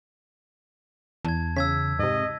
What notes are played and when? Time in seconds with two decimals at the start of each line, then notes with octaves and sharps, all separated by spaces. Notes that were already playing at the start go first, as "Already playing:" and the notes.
1.25 E2 A5 G#6
1.56 C#3 E6 G#6 B6
1.99 G#2 C3 D#5